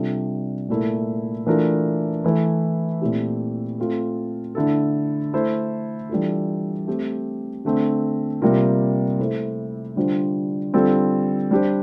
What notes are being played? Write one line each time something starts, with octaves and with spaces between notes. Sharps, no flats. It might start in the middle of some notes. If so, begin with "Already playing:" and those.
Already playing: C3 G3 D4 F4 A4
A#2 A3 E4 A#4
E3 A3 D4 F4 A#4
E3 A3 E4
A#2 A3 C4 E4 G4
A3 C4 F4 A4
D3 A3 E4 A4
A3 E4 A4 C5
E3 G3 D4 F4 A4
A3 C4 G4
D3 A3 C4
C3 G3 A#3 F4 A#4
A3 E4 A4 C5
D3 G3 D4 F4 C5
D3 G3 C4 F4 A4
G3 D4 G4 C5